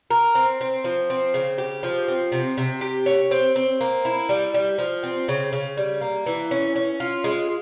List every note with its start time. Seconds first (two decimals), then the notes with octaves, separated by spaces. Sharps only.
0.11 A#4
0.35 C4
0.61 C4
0.84 F3
1.10 C4
1.34 C#3
1.58 G4
1.83 F3
2.08 C4
2.32 C3
2.58 C3
2.81 G4
3.06 C#5
3.31 C4
3.56 C4
3.80 A#3
4.05 E4
4.29 G3
4.54 G3
4.78 F3
5.03 C4
5.28 C#3
5.53 C#3
5.77 G3
6.01 A#3
6.26 E3
6.51 C#4
6.76 C#4
7.00 F4
7.24 G#3